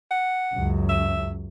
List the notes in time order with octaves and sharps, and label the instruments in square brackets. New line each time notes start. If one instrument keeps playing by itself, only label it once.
[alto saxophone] F#5
[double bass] C#2 F#2
[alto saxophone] E5